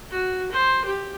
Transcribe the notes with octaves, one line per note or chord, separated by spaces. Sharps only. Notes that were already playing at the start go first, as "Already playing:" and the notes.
F#4
C5
G4